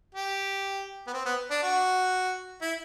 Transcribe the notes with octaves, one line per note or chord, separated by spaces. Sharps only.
G4
B3
C4
B3
D4
F#4
E4